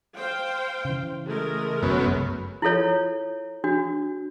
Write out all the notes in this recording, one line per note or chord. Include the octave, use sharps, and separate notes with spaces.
C5 F5 G5
C#3 E3
G#3 A3 A#4
G1 C2 F#2 C#3 B3
E4 F4 A4 C#5
D4 F#4